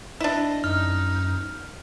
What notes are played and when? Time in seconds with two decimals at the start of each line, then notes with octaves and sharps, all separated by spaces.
0.20 D4 E4 D#5
0.64 F#2 D#4 F6